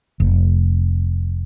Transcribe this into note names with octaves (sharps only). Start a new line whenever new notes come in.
F1